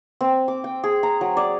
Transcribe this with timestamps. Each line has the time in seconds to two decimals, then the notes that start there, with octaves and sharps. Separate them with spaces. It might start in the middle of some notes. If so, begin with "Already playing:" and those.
0.21 C4
0.48 D6
0.64 G5
0.84 G#4
1.03 A#5
1.21 F#3
1.37 D5